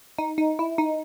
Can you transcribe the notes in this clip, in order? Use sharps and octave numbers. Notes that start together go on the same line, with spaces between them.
D#4
D#4
E4
D#4